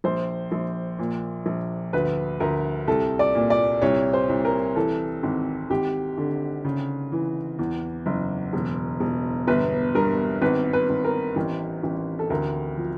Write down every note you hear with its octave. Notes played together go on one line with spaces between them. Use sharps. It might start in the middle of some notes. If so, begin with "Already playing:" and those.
A#1 C5
A#1
A#2
A#1
D2 B4
D2 A#4
C2 A4
D5
A#2
D5
C2 C#5
C5
C2
A#4
E3 A4
G#1
G#1 G4
D3
C#3
E3
E2
F#1
E1
E1
G1 B4
G2 A#4
G#1 B4
B4
G#1
A#4
A1
A1
A4
D2 A#4
F3